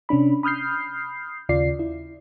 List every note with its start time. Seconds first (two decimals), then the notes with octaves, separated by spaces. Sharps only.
0.09 C3 C#4 D4 B5
0.43 B5 D#6 F6 G6 C7
1.49 D#2 C#3 F4 D5 C7
1.79 E4